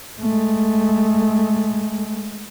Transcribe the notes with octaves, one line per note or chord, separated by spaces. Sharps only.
G#3 A3